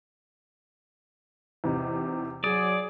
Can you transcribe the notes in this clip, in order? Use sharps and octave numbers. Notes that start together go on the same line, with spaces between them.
E2 C3 D#4
F#3 G#4 D5 D#6